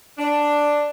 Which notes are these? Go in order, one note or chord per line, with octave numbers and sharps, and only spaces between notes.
D4